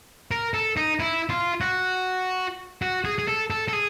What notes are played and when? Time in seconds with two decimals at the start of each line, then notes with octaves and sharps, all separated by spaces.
0.31 A#4
0.54 A4
0.77 D#4
1.00 E4
1.29 F4
1.61 F#4
2.82 F#4
3.05 G#4
3.18 G#4
3.28 A4
3.50 A4
3.68 A4
3.73 G#4